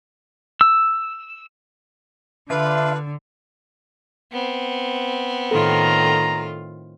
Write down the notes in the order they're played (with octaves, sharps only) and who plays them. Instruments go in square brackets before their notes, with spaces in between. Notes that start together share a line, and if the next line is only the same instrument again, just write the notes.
[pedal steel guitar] E6
[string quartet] D3 [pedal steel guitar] D4 F4 [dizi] B4 [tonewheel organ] E5
[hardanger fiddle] B3 C4
[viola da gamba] A2 D#3 F4 [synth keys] A4 [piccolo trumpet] A#5